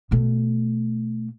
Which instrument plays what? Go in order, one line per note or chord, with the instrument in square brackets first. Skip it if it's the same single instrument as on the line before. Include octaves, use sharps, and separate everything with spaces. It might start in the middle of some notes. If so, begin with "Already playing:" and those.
[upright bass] B2 A3